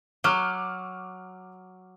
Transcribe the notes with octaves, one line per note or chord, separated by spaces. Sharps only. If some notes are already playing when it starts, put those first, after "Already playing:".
F#3 D6 F6